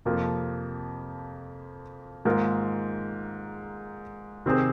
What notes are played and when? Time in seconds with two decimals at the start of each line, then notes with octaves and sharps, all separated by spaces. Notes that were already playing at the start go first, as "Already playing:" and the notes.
0.05 F2 C3 F3 A#3
2.25 G#2 D#3 A#3 F4 A#4
4.46 C3 D#3 C4 G#4 C5